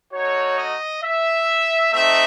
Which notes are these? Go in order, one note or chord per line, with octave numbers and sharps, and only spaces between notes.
A3 D#4 F#4 C#5
D#5
E5
A3 C4 D#4 E5